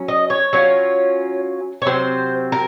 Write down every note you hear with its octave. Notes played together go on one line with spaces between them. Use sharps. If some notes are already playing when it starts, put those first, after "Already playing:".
Already playing: F#3 C#4
D#5
C#5
F#3 C#4 F4
C#5
C3 F#3 C4 C5
A#4